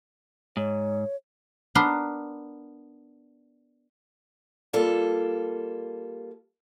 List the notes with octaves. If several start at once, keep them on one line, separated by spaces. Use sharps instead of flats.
G#2 C#5
B3 D4 A#4 B4 C6
G3 A#3 F4 A4